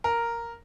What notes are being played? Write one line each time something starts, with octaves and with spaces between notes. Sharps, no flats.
A#4